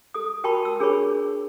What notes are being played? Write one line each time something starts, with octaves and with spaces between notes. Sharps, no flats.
A4 D#6
F#4 A#4 G5 A5 B5 C#6
A5 E6
D4 G#4 A#4 C#5 B5 C#6